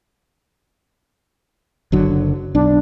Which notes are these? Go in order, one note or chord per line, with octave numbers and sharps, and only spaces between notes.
F#1 D3 F#3
B1 D4